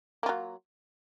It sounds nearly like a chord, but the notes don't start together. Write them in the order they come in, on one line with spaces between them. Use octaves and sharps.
A#3 F4 F#3